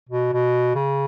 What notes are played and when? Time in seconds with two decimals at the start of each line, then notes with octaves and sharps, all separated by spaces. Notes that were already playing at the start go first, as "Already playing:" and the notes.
0.09 B2
0.33 B2
0.75 C#3